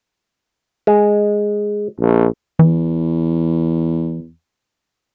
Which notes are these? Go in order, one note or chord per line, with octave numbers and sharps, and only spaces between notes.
G#3
A#1
E2 E3